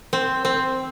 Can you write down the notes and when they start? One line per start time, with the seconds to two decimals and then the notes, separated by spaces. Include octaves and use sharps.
0.13 C4
0.45 C4